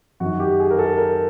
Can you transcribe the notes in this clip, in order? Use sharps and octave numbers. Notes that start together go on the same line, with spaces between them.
F#2 F#4
D#3
G4
G#4
A#4
A4
A#4